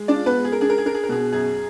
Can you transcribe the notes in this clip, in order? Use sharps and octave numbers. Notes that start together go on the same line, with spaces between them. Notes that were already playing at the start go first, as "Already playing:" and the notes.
Already playing: G#3
D4 D5
F4
B3 B4
G#3
G#4
A#4
D4 G#4
A#4
G#4
D4 A#4
G#4
A#4
B2 G#4
F#2 G#4